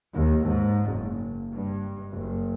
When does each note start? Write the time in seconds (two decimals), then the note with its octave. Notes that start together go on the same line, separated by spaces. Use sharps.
0.13 D#2
0.46 G#2
0.89 F#1
1.53 G2
2.13 F#1